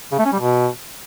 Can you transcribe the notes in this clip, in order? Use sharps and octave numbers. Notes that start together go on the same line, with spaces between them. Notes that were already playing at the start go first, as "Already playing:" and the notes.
C#3
A3
C#4
G3
B2